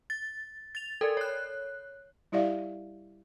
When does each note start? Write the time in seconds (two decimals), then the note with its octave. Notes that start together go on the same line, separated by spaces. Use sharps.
0.10 A6
0.75 A6 F7
1.01 A4 A#4 D5
1.17 C#5 F#6
2.32 G3 E4 G4 D5 E5 F5